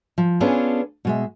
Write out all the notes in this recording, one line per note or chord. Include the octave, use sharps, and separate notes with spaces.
F3
B3 C#4 D4 F4 G#4 A4
B2 G#3 E5